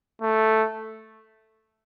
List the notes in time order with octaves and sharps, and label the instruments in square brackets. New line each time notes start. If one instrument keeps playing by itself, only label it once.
[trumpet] A3